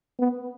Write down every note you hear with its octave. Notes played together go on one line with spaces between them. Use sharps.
B3